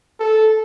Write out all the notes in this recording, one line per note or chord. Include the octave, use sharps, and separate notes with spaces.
A4